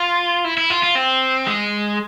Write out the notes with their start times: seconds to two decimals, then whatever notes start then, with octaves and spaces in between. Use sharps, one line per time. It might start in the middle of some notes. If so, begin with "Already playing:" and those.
Already playing: F4
0.45 E4
0.57 E4
0.70 F4
0.83 F4
0.95 C4
1.47 G#3